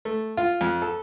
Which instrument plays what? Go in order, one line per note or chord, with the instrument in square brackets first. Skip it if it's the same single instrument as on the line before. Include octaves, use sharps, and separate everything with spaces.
[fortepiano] A3
F4
F2
A4